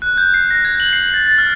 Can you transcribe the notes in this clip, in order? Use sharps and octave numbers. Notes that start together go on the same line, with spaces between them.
F#6
G6
C7
A#6
G#6
F#7
C7
A6
A6
F6